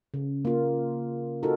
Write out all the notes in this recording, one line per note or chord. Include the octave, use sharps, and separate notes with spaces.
C#3
A#3 F4
D#4 F4 F#4 A4 A#4